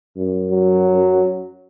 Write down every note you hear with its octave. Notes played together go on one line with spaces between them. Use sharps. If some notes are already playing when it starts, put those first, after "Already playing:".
F#2
F#3